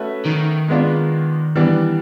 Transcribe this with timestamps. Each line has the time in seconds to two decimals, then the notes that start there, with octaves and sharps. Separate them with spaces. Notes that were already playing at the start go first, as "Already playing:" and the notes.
Already playing: A3 C#4 F#4 B4 E5
0.25 D#3
0.68 G#3 B3 D4 F4
1.55 E3 G3 B3 D4